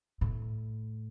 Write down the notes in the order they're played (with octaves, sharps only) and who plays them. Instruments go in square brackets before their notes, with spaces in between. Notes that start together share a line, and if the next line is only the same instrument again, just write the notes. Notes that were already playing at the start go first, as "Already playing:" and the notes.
[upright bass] A2